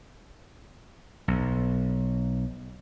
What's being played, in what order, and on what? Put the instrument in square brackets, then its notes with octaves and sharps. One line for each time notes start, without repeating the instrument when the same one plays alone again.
[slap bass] B1